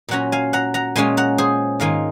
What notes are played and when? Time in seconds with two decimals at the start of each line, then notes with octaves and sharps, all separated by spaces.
0.09 A#2 F#3 C#4 F#5 A#5
0.32 F5 G#5
0.53 F#5 A#5
0.74 F#5 A#5
0.96 A#2 G#3 C#4 F4 G#5 C6
1.17 F#5 A#5
1.38 G#4 C5
1.80 G#2 D#3 A#3 F4 F5 G#5